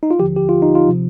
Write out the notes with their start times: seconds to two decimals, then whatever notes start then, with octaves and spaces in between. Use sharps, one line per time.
0.03 D#4
0.11 F4
0.19 D#2 D3 F3 G4
0.36 G4
0.49 F4
0.62 D#4
0.75 F4
0.88 C3 F3